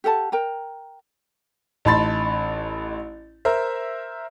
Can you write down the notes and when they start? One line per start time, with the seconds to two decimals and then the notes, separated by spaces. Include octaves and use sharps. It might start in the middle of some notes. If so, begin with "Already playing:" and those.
0.04 G4 A4 F#5 A5
0.32 A#4 G5 A#5
1.85 A1 D#4 A5 B5 C6 A6
3.45 A#4 C5 E5